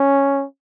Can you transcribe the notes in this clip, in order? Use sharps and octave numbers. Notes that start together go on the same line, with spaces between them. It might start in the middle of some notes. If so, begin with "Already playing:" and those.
Already playing: C#4